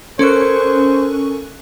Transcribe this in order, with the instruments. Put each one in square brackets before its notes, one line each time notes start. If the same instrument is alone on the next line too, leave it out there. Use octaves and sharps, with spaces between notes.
[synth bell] C#4 C#6 F#6 [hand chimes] A4 A#4 [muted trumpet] C5